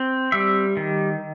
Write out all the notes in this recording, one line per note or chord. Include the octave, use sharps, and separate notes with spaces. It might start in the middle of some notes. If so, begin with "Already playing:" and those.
Already playing: C4
G3 E5
D#3